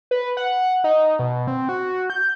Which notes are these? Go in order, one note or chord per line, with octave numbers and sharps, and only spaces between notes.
B4
F#5
D#4
B2
C4
F#4
G6